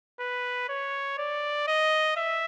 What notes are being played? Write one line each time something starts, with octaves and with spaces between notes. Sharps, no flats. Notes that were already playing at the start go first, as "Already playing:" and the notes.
B4
C#5
D5
D#5
E5